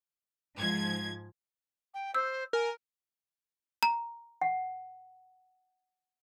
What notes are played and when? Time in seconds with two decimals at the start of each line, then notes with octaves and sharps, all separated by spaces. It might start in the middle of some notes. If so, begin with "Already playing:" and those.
0.58 G#2 F3 G#6
1.94 G5
2.14 C5 E6 G6
2.53 A#4 G#5
3.83 A#5
4.41 F#5